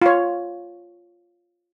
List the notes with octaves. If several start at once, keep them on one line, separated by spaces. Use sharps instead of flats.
F4 C#5